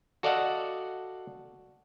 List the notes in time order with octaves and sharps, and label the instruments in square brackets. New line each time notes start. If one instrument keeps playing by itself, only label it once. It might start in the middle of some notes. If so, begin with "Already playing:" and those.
[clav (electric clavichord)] F#4 A4 D5 D#5 F5 F#5